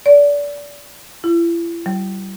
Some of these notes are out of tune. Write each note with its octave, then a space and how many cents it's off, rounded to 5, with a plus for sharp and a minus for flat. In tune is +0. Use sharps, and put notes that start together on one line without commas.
D5 -25
E4 +40
G3 -35